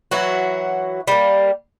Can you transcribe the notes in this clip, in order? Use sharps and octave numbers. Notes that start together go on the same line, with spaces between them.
E3 F#3 F#4
G3 A#3